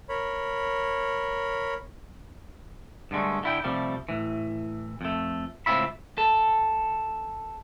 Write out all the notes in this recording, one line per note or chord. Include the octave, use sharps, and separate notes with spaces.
A#4 C#5 B5
G2 D3 G#3 A3
D3 E4 G5
C3 F3 G3 A3
A2 E3
F2 A3
C#2 A2 C4 F4 E5 B5
A4